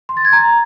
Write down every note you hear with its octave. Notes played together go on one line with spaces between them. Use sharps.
C6
A6
G#6
A#5